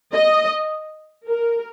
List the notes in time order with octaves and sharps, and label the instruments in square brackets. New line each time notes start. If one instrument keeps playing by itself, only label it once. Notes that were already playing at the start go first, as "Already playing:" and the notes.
[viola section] D#5
A#4